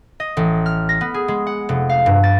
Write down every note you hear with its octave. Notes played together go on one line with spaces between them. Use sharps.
D#5
A1
F6
A#6
B3
G#4
G#3
F#5
F1
F5
G2
A6